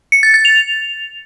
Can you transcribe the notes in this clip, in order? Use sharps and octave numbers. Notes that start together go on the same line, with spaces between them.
C#7
A6
A6
F7